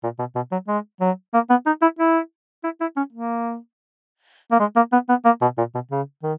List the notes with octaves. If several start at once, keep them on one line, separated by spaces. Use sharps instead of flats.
A#2
B2
B2
F#3
G#3
F#3
A#3
B3
D#4
E4
E4
E4
E4
C#4
A#3
A#3
G#3
A#3
B3
B3
A#3
B2
A#2
B2
C#3
D#3